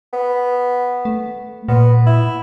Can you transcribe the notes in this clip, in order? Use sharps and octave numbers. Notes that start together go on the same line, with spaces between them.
B3
A3
A#2 B3
E4